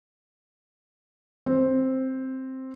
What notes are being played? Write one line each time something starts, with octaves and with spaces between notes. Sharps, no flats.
C4